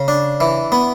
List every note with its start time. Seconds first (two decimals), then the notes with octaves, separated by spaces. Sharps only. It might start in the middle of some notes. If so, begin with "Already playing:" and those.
Already playing: C#3
0.08 D4
0.40 E3
0.72 B3